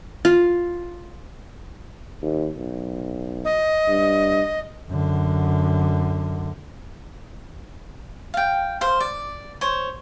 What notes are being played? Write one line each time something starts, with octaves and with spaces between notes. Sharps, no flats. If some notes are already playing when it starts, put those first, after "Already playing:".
F4
D#2
B1
D#5
G2
F#2 D3
F5 G5
A#4 C5 F5
D5
C5 C#5